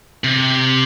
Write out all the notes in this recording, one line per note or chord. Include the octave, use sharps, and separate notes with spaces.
C3